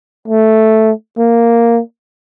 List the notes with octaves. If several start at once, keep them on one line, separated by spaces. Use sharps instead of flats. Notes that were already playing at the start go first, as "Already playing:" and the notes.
A3
A#3